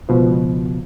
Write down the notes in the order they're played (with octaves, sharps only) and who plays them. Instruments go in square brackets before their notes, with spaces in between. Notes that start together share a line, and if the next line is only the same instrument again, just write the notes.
[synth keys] C#2 B2 F3